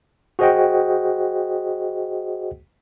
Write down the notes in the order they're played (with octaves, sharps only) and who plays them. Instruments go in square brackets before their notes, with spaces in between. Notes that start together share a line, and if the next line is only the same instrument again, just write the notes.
[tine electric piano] F#4 G#4 C5 D#5 F#5 G5